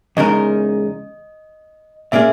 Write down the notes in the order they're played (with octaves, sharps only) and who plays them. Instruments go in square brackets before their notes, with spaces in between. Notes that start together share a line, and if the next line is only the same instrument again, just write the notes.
[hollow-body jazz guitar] E2 C#3 G#3 D#4 A#4 [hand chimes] D#5
[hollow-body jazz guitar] A#2 A#3 C#4 G#4 [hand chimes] E5